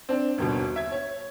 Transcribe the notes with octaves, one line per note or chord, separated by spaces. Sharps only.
C4 D4
G1 D#2 B2
E5 G#6
C#5